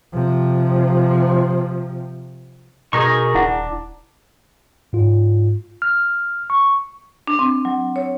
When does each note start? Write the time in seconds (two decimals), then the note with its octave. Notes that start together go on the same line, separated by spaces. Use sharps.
0.14 C3 F3
2.93 B2 D#4 G#4 A#4 C#6
3.35 D#1 D4 E4 F#5
4.93 G#2 F4
5.82 F6
6.50 C#6
7.27 D4
7.39 C4
7.65 F#3
7.96 C#5